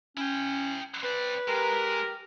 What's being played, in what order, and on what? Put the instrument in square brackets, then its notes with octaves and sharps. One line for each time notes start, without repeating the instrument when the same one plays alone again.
[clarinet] C#4 [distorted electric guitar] E4 G5
[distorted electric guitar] C4 D5 [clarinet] B4
[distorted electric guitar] G#3 [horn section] G4 A#4